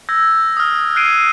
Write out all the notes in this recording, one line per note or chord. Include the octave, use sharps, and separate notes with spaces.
E6 G6 G#6 A#6
D#6 F6
F6 F#6 G#6 C7 D7 D#7